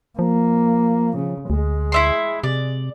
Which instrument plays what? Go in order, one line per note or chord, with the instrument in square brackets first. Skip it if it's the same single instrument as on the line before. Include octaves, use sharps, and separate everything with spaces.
[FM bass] F3 [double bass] A#3
[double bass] C#3
[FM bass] D2 [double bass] G#3
[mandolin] E4 E5 C6
[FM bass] C3 [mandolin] D5